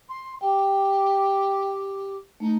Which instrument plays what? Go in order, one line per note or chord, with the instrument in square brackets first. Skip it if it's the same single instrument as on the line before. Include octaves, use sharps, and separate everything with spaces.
[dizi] C6
[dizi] G4 [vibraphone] G5
[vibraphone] A3 [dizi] D#4